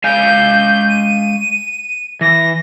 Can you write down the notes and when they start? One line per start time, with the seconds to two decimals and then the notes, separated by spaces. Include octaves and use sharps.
0.04 G#3 F5 G#5 G6
0.88 D#7
2.21 E3 A#6